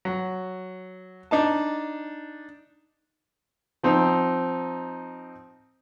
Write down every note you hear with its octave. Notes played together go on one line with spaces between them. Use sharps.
F#3
D4 D#4 A5
F3 C4 D#4